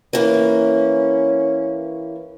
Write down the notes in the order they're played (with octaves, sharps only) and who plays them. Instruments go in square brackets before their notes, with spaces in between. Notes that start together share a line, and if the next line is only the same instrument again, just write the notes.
[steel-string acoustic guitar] E3 A#3 [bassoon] C#4